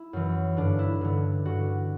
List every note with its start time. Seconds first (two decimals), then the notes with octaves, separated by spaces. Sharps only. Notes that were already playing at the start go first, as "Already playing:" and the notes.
Already playing: E4
0.13 F#2 E3
0.57 G2 D3 D4
0.79 E4
1.01 G2 D3
1.45 G2 D3 F#4